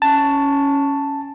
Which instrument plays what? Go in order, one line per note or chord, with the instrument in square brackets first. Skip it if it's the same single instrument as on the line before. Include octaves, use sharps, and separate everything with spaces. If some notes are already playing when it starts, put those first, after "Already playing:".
[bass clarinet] C#4 [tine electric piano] A5